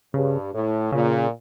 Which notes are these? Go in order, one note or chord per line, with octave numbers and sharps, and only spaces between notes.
G2 C#3
A2
A#2 C#3